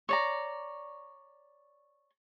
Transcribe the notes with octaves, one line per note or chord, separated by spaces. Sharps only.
C#5 D5 A#5